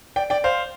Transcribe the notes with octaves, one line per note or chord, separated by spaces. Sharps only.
D5 G5
D5 G5
C5 F5